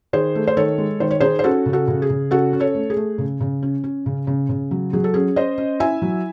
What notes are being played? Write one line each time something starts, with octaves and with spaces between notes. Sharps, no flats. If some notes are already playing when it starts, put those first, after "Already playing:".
D#3 G#4 C5
A3
C5
D#3 A4 C#5
G#3
D#3 C5
C#5
D#4 G#4 C5
C5
C#4 F#4 A4
C#3
F#4 A4
C#3
G#4
C#3
C#4 F#4 A4
C#4
A4 C#5
A3
G#4
A3
C#3
C#3
C#4
C#4
C#3
C#3
C#3
F#3
F#3 G#4
A4
C#4 G#4
C#4 C5 D#5
C#4
E4 E5 G#5
F#3